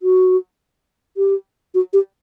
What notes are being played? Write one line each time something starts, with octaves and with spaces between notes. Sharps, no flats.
F#4
G4
F#4
G4